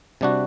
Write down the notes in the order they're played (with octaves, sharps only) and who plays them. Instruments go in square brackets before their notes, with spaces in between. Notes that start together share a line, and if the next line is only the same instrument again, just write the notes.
[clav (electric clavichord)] C3 G3 D4 F#4